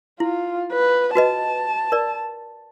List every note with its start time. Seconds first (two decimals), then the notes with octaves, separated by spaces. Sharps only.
0.20 E4 F4
0.73 B4
1.15 F#4 B4 D#5 A5
1.92 A#4 D5